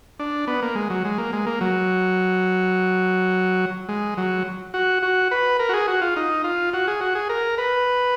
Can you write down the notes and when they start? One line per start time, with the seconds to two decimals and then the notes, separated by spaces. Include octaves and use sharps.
0.19 D4
0.47 B3
0.62 A#3
0.75 G#3
0.90 F#3
1.05 G#3
1.18 A#3
1.33 G#3
1.46 A#3
1.61 F#3
3.89 G#3
4.17 F#3
4.74 F#4
5.03 F#4
5.31 B4
5.59 A#4
5.69 F#4
5.74 G#4
5.88 F#4
6.01 F4
6.16 D#4
6.44 F4
6.73 F#4
6.87 G#4
7.01 F#4
7.15 G#4
7.29 A#4
7.58 B4